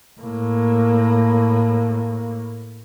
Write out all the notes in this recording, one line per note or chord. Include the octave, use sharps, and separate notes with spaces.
A2 A#3